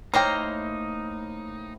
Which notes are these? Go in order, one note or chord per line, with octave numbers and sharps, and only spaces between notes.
A2 A#3 D#4 C5 C#5 G5 A#5